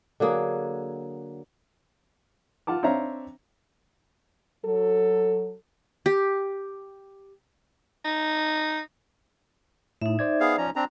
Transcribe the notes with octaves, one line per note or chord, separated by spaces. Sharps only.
D3 F#3 A#3 G#4
F4 F#5 A5 D6
C4 D4 C#5 E5 F5 A#5
F#3 A4
G4
D#4
A2 D#4 E5
C5 D5 G#6
B3 G#4 F5
F3 C#4 A#5
C4 D4 A#5